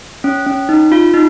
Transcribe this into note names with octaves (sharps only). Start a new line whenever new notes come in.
C#4
C#4
D#4
F4
D#4